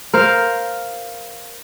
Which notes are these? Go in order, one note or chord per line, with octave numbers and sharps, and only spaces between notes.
A#4 C5 F5